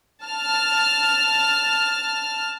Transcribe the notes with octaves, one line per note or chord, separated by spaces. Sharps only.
A5 F6